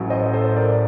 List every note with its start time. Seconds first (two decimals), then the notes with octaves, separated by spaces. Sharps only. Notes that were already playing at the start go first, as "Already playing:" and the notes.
Already playing: A1 A2 F#3
0.10 C5 D#5
0.33 A4 C5
0.56 A#4 D5